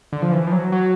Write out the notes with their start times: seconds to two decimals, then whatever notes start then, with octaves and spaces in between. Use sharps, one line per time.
0.12 D3
0.22 F3
0.32 E3
0.47 F3
0.52 F#3
0.72 F#3